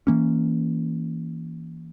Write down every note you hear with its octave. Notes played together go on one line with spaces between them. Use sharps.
E3 A#3 C#4